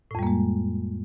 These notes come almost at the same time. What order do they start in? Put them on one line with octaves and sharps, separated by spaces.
A2 F2 G3 A#3 G#3